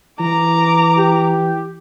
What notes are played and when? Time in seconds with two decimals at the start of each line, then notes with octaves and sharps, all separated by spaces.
0.20 E3 A#5 D6
0.98 G4